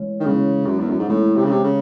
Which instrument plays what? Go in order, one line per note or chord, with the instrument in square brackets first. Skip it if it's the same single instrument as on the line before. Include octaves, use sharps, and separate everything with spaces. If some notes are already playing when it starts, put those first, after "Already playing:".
Already playing: [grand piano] E3 G#3 C#4
[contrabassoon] D#3
[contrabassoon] C#3 [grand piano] E3 G#3 C#4
[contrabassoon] F#2
E2
F#2
G#2
[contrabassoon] A2 [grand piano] E3 G#3 C#4
[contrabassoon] C3
C#3
C3
C#3